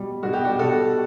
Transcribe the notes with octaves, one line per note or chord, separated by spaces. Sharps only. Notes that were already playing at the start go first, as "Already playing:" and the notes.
Already playing: B2 G3
B2 G3 F#4
G4
D4 F#4
B2 G3 F#4 A4